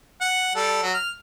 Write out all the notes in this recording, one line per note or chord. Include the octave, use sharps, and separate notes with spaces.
F#5
G3 A4
F#3
F6